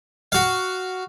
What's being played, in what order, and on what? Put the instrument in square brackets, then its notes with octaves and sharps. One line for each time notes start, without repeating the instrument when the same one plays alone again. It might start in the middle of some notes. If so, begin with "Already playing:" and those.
[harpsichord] F#4 F5